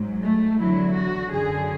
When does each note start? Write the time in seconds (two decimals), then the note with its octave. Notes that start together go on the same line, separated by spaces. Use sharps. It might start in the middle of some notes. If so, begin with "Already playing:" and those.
Already playing: G#2 F#3
0.22 A3
0.58 E2 D3 F#3 E4
0.95 F#4
1.32 F#2 D3 F#3 G#4